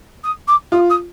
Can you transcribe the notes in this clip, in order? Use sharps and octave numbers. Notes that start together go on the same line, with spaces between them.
D#6
D6
F4 D#6
D#6